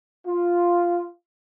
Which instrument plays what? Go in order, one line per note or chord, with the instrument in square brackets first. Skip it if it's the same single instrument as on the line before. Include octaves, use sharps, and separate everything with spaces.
[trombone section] F4